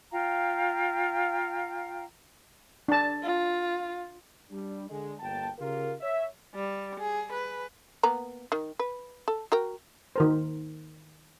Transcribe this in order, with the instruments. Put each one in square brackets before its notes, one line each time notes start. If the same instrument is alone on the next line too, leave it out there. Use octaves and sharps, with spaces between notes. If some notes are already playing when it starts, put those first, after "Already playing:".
[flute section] F4 F5 G5 A#5
[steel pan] D4 A5
[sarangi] F4
[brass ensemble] G3 D4
D3 G#3
G1 D2 A#3 G5 A5
C#3 F4 G4 A#4
C#5 E5
[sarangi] G3
G#4
B4
[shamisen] A#3 B3 A#5
D#3
B4
A4
F#4 A#4 G5
[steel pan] D#3 A#4 C5